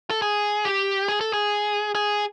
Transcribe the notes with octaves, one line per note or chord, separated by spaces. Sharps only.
A4
G#4
G4
G#4
A4
G#4
G#4